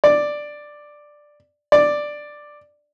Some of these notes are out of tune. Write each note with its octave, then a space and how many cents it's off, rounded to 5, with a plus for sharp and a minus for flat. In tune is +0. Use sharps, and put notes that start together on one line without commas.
D5 +5
D5 +5